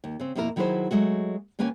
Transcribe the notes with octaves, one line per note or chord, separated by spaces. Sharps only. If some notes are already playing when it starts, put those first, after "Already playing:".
D#2
C#3 C4
F2 B2 A#3 E4 A#4
D#3 F#3 E4 G#4 B4 C5
F#3 G#3 A3 F#4
D#2 A#3 C#4 B4 G#5